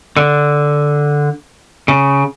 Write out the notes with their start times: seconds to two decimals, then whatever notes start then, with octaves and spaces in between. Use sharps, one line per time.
0.17 D3
1.88 C#3